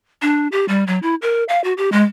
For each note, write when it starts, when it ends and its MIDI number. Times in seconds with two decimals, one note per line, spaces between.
0.22 0.48 62
0.52 0.65 67
0.68 0.84 55
0.87 0.99 54
1.02 1.15 64
1.22 1.44 70
1.49 1.62 77
1.64 1.73 66
1.77 1.89 67
1.92 2.03 56